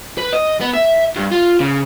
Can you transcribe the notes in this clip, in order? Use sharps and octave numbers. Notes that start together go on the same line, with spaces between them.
B4
D#5
B3
E5
G2
F4
C#3